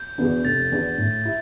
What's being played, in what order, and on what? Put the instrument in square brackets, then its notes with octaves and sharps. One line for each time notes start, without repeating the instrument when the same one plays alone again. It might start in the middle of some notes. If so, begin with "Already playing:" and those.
Already playing: [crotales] G6
[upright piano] E2 B2 B3 D4
[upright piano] F1 [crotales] A6
[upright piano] E2 B2 B3 D4
A2
E4